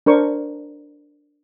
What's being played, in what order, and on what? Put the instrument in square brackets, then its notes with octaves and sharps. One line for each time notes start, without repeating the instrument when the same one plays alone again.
[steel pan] D4 A#4 C5 C#6